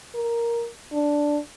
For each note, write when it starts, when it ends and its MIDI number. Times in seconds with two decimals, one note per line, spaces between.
0.15 0.68 70
0.93 1.39 62